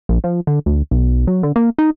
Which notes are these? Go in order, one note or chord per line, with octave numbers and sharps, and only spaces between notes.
A#1
F3
D3
D2
B1
F#3
D3
A#3
D#4